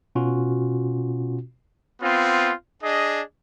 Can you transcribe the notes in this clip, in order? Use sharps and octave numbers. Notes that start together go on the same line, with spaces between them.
B2 C#4 F4 F#4
B3 C4 F4
D4 G#4 D#5